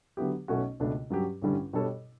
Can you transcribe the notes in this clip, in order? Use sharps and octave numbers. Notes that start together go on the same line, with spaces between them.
D3 F#3 B3 E4 G4
B1 B2 A3 C#4 F#4
C#2 B2 A3 D4
G2 F#3 C#4 G4
A1 G2 D3 G3 C#4
B2 G3 D4 A4 C#5